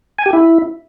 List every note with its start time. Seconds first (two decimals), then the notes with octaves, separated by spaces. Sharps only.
0.19 G#5
0.26 G4
0.33 E4